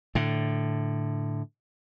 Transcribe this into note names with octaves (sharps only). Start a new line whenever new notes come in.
A2 D3